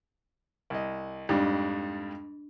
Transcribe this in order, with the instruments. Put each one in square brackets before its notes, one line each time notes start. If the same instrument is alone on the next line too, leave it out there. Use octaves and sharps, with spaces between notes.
[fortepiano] C2 D#5
[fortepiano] F2 G#2 G3 [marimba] D4